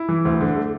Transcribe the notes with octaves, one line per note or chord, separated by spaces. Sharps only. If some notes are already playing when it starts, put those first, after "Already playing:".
Already playing: E4
E3
D2
D3
A3